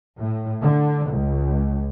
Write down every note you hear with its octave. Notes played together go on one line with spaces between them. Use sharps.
A2
D3
C#2